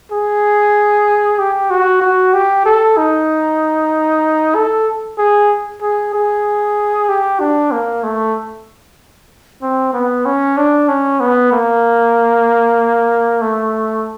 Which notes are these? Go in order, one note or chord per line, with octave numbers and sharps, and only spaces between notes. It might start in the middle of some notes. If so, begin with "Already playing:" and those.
G#4
G4
F#4
F#4
G4
A4
D#4
A4
G#4
G#4
G#4
G4
D4
A#3
A3
C4
B3
C#4
D4
C#4
B3
A#3
A3